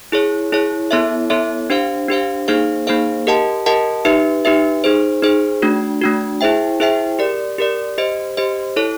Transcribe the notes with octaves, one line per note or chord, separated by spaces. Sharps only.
E4 G#4 C#5
E4 G#4 C#5
B3 E4 A4 C#5 E5
B3 E4 A4 C#5 E5
D4 G4 C5 F5
D4 G4 C5 F5
A#3 D#4 G#4 C5 F5
A#3 D#4 G#4 C5 F5
G4 A#4 D#5 F#5 A5
G4 A#4 D#5 F#5 A5
D#4 G4 B4 E5
D#4 G4 B4 E5
D#4 G#4 C5
D#4 G#4 C5
A3 D4 F#4
A3 D4 F#4
E4 G#4 C5 E5 G5
E4 G#4 C5 E5 G5
G4 A#4 D5
G4 A#4 D5
G4 C5 D#5
G4 C5 D#5
E4 A4 C#5